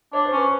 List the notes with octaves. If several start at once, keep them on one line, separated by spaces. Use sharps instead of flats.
D4 C#5
C5
C#4 B4